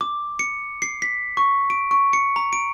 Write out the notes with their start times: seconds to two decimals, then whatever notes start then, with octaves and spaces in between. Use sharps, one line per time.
0.01 D6
0.39 C#7
0.82 C7
1.02 B6
1.37 C#6
1.70 D7
1.91 C#6
2.13 C#7
2.36 A#5
2.53 D7